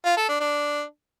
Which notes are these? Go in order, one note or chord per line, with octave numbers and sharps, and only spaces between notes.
F4
A4
D4
D4